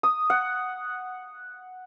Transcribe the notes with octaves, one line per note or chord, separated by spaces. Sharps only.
D#6
F#5